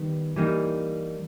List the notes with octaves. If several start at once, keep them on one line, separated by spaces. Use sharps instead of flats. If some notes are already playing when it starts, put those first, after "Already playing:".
Already playing: D#3 G3 B3
E3 G3 A#3 D#4